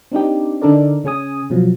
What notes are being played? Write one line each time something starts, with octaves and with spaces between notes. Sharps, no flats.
C4 D4 D#4 G4
D3 D4 D#4 A4 A#4 D5
C#3 C#4 G#4 G#5 D#6
B2 F3 F#3